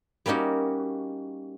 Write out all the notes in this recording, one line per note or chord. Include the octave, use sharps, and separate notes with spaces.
G3 A#3 C#4 D#4 F#4